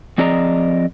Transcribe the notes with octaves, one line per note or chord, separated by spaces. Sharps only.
F3 C4 G#4 D5 D#5 A#5